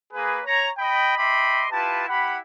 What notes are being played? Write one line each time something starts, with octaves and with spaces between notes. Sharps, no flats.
A#3 G#4 B4
C#5 A#5
D#5 G5 B5
D#5 E5 G5 B5 C6 D6
E4 F4 G4 B4 A5
E4 G4 F#5 B5